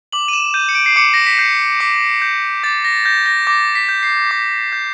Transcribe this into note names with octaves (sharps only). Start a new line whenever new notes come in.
D6 F#7
D#7
E7
G6 D#7
C#7
D7
C7
D6 C#7
A#6
B6
G6 C7
D6 B6
G6
D6 A6
A#6
G6 A#6
A#6
D6 A#6
B6
G6
C7
D6
G6